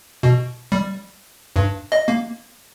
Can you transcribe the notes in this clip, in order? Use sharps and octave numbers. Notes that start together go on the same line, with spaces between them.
B2
G3
G2
D#5
A#3